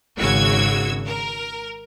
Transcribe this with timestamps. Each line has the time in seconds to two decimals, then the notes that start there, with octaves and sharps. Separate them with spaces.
0.17 G#1 C#3 F#4 E6 G#6
1.06 A#4